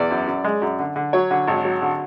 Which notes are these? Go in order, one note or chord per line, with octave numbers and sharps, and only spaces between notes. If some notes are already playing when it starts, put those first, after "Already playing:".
Already playing: E2 D5
F#2
F#2
G#3
F#2
D3
D3
F#3 C#5
D3
G#1
F#3
D3